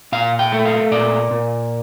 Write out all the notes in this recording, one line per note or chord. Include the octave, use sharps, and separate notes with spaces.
A#2 F5
G5
A3
F5
A#2 D5
A#2